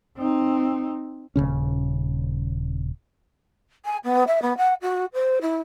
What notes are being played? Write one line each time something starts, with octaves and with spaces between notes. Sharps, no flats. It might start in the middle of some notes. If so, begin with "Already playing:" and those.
C4 D#4
D#1 B1 C#3 C#4
G#5
B3
E5
B3
F#5
F#4
C5
E4